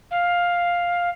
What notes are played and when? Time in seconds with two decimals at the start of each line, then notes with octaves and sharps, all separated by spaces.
0.11 F5